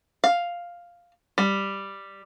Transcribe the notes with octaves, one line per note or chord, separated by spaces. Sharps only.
F5
G3